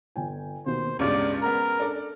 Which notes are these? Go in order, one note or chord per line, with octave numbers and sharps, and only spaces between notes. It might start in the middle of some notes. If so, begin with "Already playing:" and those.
G1 G5 G#5
D#2 B2 C5
C#2 G2 B2 G#3 C#4 D5
B3 A#4 A#5
D4 A4 D5